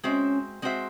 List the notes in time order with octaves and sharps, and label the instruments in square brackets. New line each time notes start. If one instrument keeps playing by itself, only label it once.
[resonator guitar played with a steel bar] G#3 C4 F#4 C5 E5 [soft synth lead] C#4
[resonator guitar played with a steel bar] G#3 C4 F#4 C5 E5